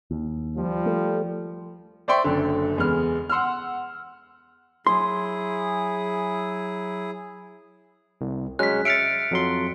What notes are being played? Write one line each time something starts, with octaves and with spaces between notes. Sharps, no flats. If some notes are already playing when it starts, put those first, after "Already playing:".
D#2
F3 G3
A3
C5 D5 E5 G5 C6 C#6
F#1 F#2 D3
E2 G#3 B3 F6
F#5 C6 E6 F6
F#3 E4 G#4 C6
C2
F#3 G#3 C#4 F#6 B6
E5 F6 A6 B6 C#7 D7
F2 F#3 C6